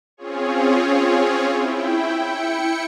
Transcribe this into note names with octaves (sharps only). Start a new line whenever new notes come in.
C4 C#4 F4 G#4 C#5
E4 G5
E4 G5 C#7